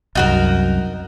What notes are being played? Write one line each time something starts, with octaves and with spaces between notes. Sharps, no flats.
C2 F#2 D#4 F#4 A#4